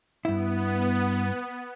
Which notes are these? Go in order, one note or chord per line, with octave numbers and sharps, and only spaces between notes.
G2 B3 E4